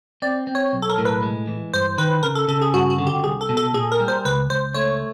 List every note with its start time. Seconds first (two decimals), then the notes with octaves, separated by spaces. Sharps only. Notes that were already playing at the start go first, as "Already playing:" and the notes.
0.22 C4 D5
0.47 C4
0.55 C#5
0.73 B1
0.82 A4
0.90 A#4
0.98 A2
1.05 B4
1.22 G#3
1.47 E3
1.74 G2 C5
1.98 D#3 B4
2.23 C#3 A#4
2.35 A4
2.48 C#3 A4
2.61 G#4
2.74 G2 F#4
2.90 F#4
2.98 D3
3.07 G4
3.24 C2 G#4
3.41 A4
3.49 B2
3.57 A4
3.74 A#2 G#4
3.92 A#4
3.99 G3
4.08 C5
4.25 C#2 B4
4.50 C#2 C5
4.74 A3 C#5